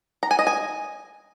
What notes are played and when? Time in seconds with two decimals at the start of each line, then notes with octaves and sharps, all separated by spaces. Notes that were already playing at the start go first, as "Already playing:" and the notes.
0.23 A#5
0.31 G#5
0.39 D#5
0.47 G#5